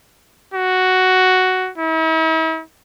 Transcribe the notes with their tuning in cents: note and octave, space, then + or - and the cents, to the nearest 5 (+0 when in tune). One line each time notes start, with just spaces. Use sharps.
F#4 +5
E4 -45